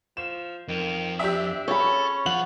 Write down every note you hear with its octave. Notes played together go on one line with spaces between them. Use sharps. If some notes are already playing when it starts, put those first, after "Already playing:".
F3 E7
F2 D#3
D4 G4 E5
C#4 A4 C#5 B5
F3 F4 F#5 F#7